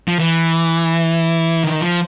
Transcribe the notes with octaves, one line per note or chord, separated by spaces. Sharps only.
F3
E3
D#3
F3